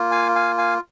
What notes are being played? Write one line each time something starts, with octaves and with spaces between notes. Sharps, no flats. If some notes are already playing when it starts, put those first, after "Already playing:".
Already playing: A#3 F4
F5 G#5
F5 G#5
F5 G#5